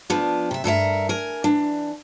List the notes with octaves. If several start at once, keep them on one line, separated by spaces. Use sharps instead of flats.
F3 B3 D4
C3 E5
G2 A4 A#4 E5
A#4 G#5
E3 D4